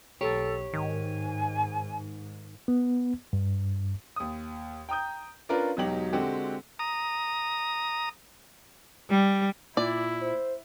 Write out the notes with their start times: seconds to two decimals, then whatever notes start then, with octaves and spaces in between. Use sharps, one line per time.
0.21 B1 G4 A4 C#5
0.73 G#2 D#3 G#5
2.68 B3
3.33 G2
4.16 D#2 D#6
4.89 G5 A#5 D#6 G6
5.49 C#4 D4 F4 A#4 B4 D5
5.77 E1 B2 F#3 D#4 G4 F#7
6.13 D3 G#3 C4 F#4 G4
6.79 A#5 D#6
9.10 G3
9.77 A#2 E4 D5
10.22 C5